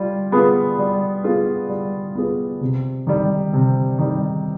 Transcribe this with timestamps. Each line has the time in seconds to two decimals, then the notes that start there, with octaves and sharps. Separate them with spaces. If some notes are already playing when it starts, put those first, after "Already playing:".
Already playing: G3 F4
0.32 B3 F4 G#4 B4
0.79 G3
1.24 B3 F4 G#4 B4
1.69 G3
2.15 B3 F4 G#4 B4
2.61 C3
3.07 D#3 G3
3.53 C3
3.99 D#3 G3